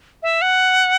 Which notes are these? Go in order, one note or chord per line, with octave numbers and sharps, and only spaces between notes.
E5
F#5